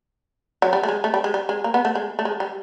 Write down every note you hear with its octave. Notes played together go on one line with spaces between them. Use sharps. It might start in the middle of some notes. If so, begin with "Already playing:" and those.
F#3
G3
A3
G#3
A3
G3
G#3
G3
G#3
A#3
B3
A3
G#3
A3
G#3
G3